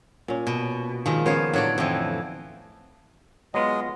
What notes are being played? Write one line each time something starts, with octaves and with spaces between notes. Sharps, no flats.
A#2 C#4
B2
A#2 D#3 F3 G#3
C#3 A#3 B3 C5 C#5 F5
A2 D3 F#3 C#5 D5
F2 E3 C5 G5
F#3 G#3 B3 F4 D#5